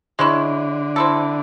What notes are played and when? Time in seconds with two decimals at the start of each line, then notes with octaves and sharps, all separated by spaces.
0.19 D3 G#3 C#4 E4
0.96 C4 E4 A4